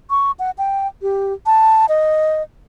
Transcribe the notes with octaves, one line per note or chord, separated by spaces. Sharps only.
C#6
F#5
G5
G4
A5
D#5